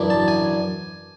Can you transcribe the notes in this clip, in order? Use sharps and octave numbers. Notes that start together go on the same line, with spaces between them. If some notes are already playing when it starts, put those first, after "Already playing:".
Already playing: F#2 E3 B3 D4
A5
G#5